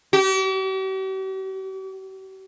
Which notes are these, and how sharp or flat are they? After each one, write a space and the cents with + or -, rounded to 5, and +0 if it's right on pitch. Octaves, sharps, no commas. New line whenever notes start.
G4 -45